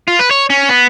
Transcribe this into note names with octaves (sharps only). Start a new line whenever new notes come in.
F4
B4
C#5
C#4
B3